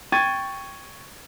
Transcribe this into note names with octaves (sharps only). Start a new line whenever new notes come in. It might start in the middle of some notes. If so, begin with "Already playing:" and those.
G5 C#6 G#6 A6 D#7